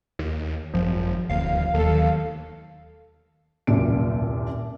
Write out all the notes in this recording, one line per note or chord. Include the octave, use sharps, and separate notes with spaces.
D#2
G#1 F#2 F3 C4
D#1 D2 F3 A#3 F5
D#2 D#3 F#3 A3 A4
D#1 C2 F#2 A#2 D7